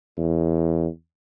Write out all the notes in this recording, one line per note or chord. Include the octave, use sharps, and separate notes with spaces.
E2